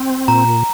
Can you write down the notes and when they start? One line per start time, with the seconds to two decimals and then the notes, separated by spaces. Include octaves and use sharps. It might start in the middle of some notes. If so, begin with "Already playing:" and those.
Already playing: C4
0.28 A#2 A#5